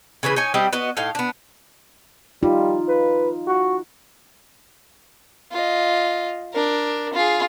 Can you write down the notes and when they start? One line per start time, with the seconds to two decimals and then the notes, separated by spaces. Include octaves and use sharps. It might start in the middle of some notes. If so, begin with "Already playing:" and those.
0.23 C#3 E3 G#4 B4
0.36 D#4 C#5 G#5
0.54 G3 C4 G4 D#5
0.73 B3 F#4 D#5
0.97 A2 D#4 F5
1.15 B3 D4
2.43 G3 D#4 F4
2.88 B4
3.47 F#4
5.52 F4 D#5
6.53 D4 A#4
7.13 F4 G#4